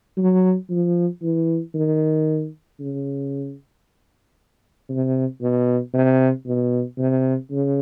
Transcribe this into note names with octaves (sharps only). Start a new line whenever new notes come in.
F#3
F3
E3
D#3
C#3
C3
B2
C3
B2
C3
C#3